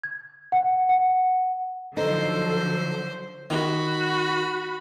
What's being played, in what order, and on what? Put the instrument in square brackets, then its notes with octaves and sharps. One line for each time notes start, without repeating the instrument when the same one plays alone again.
[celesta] G#6
F#5
F#5
[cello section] D3 F3 F#3 [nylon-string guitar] D#4 [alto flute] A4 [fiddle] C5
[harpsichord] D#3 [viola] F#4 B5